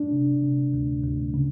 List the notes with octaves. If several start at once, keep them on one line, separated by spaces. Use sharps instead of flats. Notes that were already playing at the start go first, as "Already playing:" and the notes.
Already playing: D4
C3
C3
D2
D2
C#3